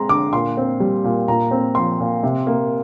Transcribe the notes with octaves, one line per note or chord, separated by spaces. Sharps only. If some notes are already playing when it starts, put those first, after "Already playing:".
Already playing: G#3 C4 A#5 C6
D3 D6
A#2 C6
C4
G3
A#2
A#2 A#5
C4
F3 C6
A#2
C3
A#3